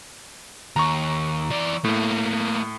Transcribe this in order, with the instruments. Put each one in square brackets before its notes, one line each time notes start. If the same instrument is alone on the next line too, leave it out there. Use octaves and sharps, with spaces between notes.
[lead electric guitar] D#2 [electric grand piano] A#5 C#6
[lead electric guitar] E3 D5
[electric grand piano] A2 [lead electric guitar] A3 A#3